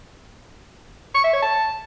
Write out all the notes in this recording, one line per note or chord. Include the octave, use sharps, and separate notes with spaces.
C#6
E5
C#5
A5